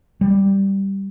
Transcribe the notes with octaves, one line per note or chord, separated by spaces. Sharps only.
G3